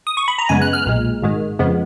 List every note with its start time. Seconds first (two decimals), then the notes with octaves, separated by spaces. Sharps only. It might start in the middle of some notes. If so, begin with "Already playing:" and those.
0.07 D#6
0.17 C#6
0.28 B5
0.38 A#5
0.49 F#2 C#3 G#3 B3 G#5
0.62 F#6
0.73 F6
0.86 B1 A#2 G#3
1.22 G#1 G#2 D#3 G#3
1.59 F2 C#3 F3 G#3 B3